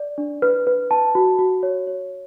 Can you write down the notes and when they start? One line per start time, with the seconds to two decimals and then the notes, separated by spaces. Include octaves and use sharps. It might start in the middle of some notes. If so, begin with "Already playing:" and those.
Already playing: D5
0.18 D4
0.42 B4
0.67 B4
0.91 A5
1.15 F#4
1.39 F#4
1.63 C#5
1.87 C#5